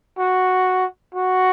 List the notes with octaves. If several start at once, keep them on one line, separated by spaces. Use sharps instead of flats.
F#4
F#4